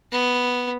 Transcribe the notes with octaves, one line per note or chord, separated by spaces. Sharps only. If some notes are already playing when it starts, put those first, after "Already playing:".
B3